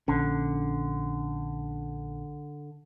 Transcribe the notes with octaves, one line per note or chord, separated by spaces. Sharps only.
A#1 D3 C#4